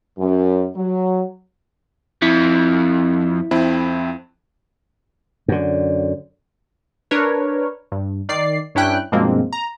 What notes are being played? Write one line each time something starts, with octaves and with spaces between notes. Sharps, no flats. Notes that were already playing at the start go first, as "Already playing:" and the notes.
F#2
F#3
F2 E4 B6
F2 C4 E4
F#2 D3
D4 A#4 B4 C#5
G2
D#3 D5 C7
G2 C#4 D4 E4 G5 F#6
G2 B2 F3 G#3 A#3 C4
A#5